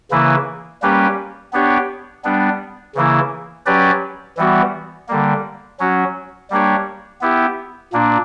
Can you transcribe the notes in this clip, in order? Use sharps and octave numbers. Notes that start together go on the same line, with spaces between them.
C#3 E3 A#3 E4 B4
G3 A#3 C#4 G4 B4
B3 D4 G4 C#5
G3 B3 D4
C#3 E3 A#3 E4
F#3 C#4 G4 B4 D5
E3 G3 B3 F#4
D3 G3 A#3
F#3 C#4 F#4
G3 A#3 D4 G4 C#5
B3 E4 G4
A#2 A#3 D4